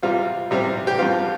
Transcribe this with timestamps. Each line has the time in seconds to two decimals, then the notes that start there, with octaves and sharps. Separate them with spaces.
0.03 C3 G3 C4 F4
0.51 C3 G3 C4
0.87 G4
0.99 G2 F3 C4 F4